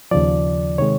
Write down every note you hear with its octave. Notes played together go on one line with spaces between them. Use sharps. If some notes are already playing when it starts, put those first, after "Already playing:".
D#2 C#3 F3 D5
C3 D#3 G#3 C#5